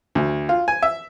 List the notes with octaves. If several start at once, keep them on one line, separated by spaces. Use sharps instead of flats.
D2
F4
G#5
E5